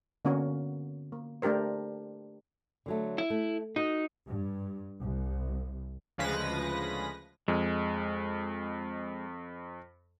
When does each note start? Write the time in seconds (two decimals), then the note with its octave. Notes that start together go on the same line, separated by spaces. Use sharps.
0.25 D3 A#3 B3 C#4 F#4 A#4
1.12 A#3
1.42 A3 D4 G4 A#4 C5
2.86 D3 F#3 A3
3.18 E4
3.30 A3
3.76 D#4 F#4
4.27 G2
5.01 C2
6.18 D2 C#3 F3 G#3 B4 A#6
7.48 F2 G#3